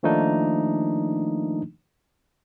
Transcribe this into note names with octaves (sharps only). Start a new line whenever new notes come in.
D#3 F3 A3 A#3 D4 D#4